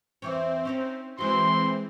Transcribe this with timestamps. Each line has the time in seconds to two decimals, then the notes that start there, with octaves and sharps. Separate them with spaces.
0.22 E2 E3 C4 C#5
0.65 C#4 D#4 A#4
1.18 E3 G#3 C4 F#4 C6